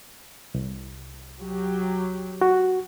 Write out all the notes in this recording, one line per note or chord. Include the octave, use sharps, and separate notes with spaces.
C2
F#3 G4
F#4